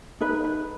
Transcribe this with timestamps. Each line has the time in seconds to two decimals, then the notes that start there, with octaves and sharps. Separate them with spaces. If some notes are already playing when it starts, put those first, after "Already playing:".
0.21 D#4 B4
0.44 B4